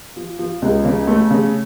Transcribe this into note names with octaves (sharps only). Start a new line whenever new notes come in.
F3
F3
C#2
C#3
A3
C#3